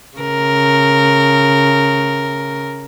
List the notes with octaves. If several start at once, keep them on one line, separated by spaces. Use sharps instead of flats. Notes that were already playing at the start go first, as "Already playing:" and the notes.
C#3 A#4